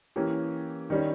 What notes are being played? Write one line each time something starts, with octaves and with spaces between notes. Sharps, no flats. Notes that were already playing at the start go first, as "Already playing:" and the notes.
E3 A#3 C#4 G4
D#3 G3 C#4